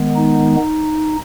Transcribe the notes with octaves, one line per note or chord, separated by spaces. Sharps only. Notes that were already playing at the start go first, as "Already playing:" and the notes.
Already playing: D#3 G#3 B3
D#4